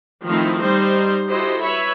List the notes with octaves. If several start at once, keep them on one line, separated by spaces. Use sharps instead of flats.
D#3 F3 A3 C4 D#4 E4
G3 D#4 C5
E4 F#4 G4 A4 C5 D#5
B4 C#5 E5 B5